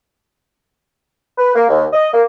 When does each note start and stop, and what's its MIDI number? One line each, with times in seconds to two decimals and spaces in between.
1.38 1.52 71
1.55 1.66 58
1.69 1.86 39
1.93 2.07 75
2.13 2.22 58